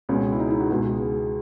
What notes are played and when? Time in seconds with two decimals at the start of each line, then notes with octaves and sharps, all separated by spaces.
0.09 C#2 B2 G#3 C#4
0.33 E4
0.40 D#4
0.50 E4
0.60 F#4
0.71 C#2 B2 G#3 G#4